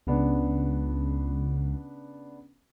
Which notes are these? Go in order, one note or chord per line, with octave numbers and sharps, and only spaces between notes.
C#2 C#3 B3 D4